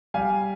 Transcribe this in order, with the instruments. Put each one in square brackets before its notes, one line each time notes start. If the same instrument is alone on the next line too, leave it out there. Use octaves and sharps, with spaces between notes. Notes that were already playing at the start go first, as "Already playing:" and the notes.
[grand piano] G3 F5 G#5